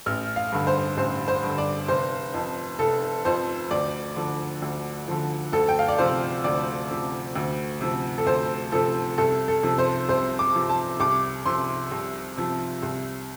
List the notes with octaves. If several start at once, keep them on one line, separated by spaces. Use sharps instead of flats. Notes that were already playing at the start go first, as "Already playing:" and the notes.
A1 F6
F5
G2 D3
C5
A1 C5
C5
G2 D3
D5
F1 C5
F2 F3
F1 A4
F2 F3 C5
D2 D5
D3 F3
D2
D3 F3
D2 A4
G5
F5
D5
C3 F3 C5
D2 D5
C3 F3
D2
C3 F3
A4
D2 C5
C3 F3 A4
C2 A4
A4
C3 F3
C5
C2 C5
D6
C3 F3
A5
C2 D6
C3 F3 C6
C2
C3 F3
C2